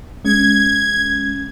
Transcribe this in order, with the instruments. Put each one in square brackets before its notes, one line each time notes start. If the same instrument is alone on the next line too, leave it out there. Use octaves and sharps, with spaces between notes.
[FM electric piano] G#3 C#4 [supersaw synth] G#6